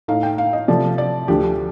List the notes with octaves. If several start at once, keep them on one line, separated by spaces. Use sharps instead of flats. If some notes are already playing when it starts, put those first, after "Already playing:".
A2 A3 D#4 F5
G5
F5
D#5
C3 F3 A3 D5
D5
D2 D3 F3 G4